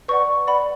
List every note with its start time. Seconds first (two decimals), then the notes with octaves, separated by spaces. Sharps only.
0.08 B4 D5 F#5 C#6
0.47 B4 D5 F#5 B5